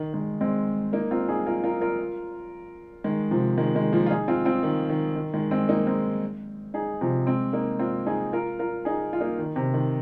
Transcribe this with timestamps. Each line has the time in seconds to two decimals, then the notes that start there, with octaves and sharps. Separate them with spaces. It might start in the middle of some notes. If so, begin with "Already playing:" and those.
Already playing: D#3
0.14 D#3 G#3
0.41 G#3 C4
0.93 A#3 D#4
1.11 C4 F4
1.29 D#4 G#4
1.47 F4 A#4
1.64 F4 A#4
1.81 F4 A#4
3.04 D#3 G#3
3.31 C3 F3
3.57 D#3 G#3
3.75 D#3 G#3
3.93 F3 A#3
4.06 F4
4.10 D#4 G#4
4.28 C4 F4
4.45 C4 F4
4.63 D#3
4.89 D#3
5.16 D#3
5.34 D#3 G#3
5.51 G#3 C4
5.69 A#3 D#4
5.87 G#3 C4
6.74 D#4 G#4
7.01 C3 F3
7.27 G#3 C4
7.53 A#3 D#4
7.79 C4 F4
8.06 D#4 G#4
8.33 F4 A#4
8.59 F4 A#4
8.85 D#4 G#4
9.13 F4
9.21 A#3 D#4
9.39 D#3
9.56 C3
9.74 D#3